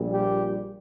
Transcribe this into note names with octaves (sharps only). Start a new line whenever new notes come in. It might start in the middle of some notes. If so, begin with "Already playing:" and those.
Already playing: A#1 A#2 G3
G4